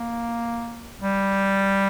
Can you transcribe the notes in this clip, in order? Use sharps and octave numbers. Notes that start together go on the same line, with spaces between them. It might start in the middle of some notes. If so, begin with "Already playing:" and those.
Already playing: A#3
G3